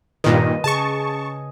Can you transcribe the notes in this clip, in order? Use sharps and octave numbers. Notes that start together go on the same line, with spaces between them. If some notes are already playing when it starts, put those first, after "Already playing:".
G2 A#2 D#3 B4 D#5
C#3 G#4 A5 C#6